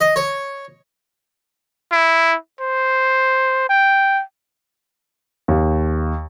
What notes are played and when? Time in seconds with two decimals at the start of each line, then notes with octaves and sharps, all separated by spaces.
0.01 D#5
0.16 C#5
1.92 E4
2.60 C5
3.69 G5
5.48 D#2